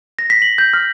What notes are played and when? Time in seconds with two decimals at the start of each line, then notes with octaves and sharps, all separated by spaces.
0.19 A#6
0.30 B6
0.42 F#7
0.58 G6
0.73 F6